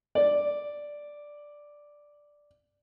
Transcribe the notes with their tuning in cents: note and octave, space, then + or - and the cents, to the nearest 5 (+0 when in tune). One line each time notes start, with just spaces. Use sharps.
D5 +0